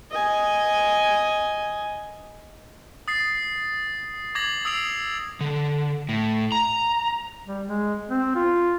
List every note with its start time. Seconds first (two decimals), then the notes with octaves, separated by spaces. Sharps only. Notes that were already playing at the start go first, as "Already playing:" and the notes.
0.11 D#5 G#5
3.08 D#6 A6 C7
4.35 D6 G#6 A#6 F#7
4.65 D#6 E6 C7 D7 F7
5.41 D3
6.09 A2
6.52 A#5
7.47 G3
7.68 G#3
8.09 C4
8.35 F4